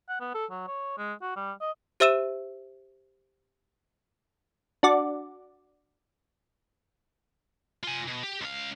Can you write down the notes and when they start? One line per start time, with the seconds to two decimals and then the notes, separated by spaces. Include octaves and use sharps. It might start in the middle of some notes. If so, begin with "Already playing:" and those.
0.09 F#5
0.20 B3
0.34 A4
0.50 F#3
0.67 C#5
0.98 G#3
1.22 F#4
1.36 G3
1.61 D#5
2.00 G4 C5 E5 E6 D#7 E7
4.83 D4 F#4 D5
7.84 F4 G#5
8.07 B2
8.23 G4
8.41 C#2 F5